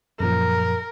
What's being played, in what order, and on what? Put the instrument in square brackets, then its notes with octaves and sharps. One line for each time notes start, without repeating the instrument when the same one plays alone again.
[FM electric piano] F#2 A#2 F3 [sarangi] A#4